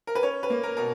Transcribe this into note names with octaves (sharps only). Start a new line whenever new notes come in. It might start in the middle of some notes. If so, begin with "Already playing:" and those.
A#4
B4
C#4 C#5
B4
A#3
A#4
B2 A#4